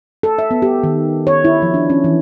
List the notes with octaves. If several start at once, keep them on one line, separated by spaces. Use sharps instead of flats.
A4
E5
B3
G4
D#3
C#5
E4
F3
D4
C#4
E3